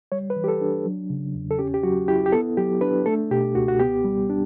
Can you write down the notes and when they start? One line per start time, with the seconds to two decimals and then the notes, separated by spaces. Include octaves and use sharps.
0.12 G3 C#5
0.30 B4
0.36 E3
0.44 G4
0.48 A4
0.61 D4
0.85 F#3
1.10 C#3
1.35 E2
1.51 A4
1.59 C#4 G4
1.74 G4
1.83 F#3 F#4
2.08 E4 G4
2.26 G4
2.32 B3 A4
2.57 F#3 G4
2.81 D4 B4
3.06 A3 A4
3.31 B2 G4
3.55 C#2 F#4
3.68 F#4
3.80 B3 G4
4.04 G3
4.29 D4